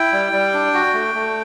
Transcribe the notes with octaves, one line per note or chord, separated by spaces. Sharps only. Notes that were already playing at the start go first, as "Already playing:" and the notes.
Already playing: E4 G5
G3
G3
D4
F#4
A3
A3